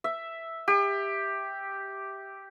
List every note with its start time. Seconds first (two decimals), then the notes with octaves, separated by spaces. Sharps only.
0.04 E5
0.68 G4